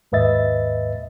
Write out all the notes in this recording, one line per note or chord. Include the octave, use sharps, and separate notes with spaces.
D#2 G#2 B4 D#5 E5 A6